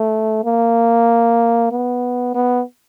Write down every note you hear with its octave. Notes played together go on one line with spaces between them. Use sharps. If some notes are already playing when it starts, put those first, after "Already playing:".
Already playing: A3
A#3
B3
B3